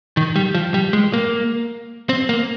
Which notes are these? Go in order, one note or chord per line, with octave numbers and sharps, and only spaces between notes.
D#3
G3
F3
G3
G#3
A#3
C4
A#3